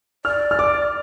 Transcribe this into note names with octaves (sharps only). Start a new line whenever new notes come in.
D5 F6
F6
D6